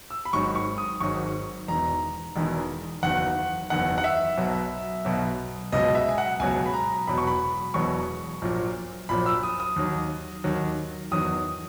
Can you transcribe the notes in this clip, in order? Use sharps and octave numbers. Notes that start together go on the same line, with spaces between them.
E6
B5
G#1 G#2 D#3 F#3 C#6
C#6
D#6
G#1 G#2 D#3 F#3 C#6
E1 E2 D#3 A#5
E1 E2 D#3
F#1 E2 D#3 F#5
F#1 E2 D#3 F#5
F#5
E5
B1 B2 F#3
B1 B2 F#3
C#2 B2 F#3 D#5
E5
G#5
F#5
C#2 B2 F#3 G#5
B5
A#5
E1 E2 B2 F#3 B5
C#6
B5
E1 E2 B2 F#3 C#6
A#1 A#2 F#3
A#1 A#2 F#3 B5
E6
D#6
D#6
D#2 D#3 F#3
D#2 D#3 F#3
E2 D#3 F#3 D#6